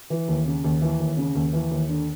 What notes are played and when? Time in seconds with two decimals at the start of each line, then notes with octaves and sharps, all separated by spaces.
0.10 E3
0.28 D#2
0.46 C#3
0.64 D#2
0.82 E3
0.99 D#2
1.17 C#3
1.35 D#2
1.53 E3
1.71 D#2
1.89 D3